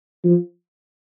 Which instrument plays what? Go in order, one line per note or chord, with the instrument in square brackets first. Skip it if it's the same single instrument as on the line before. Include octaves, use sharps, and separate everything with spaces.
[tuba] F3